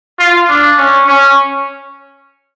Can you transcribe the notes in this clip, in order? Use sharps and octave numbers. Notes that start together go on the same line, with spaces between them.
F4
D4
C#4
C#4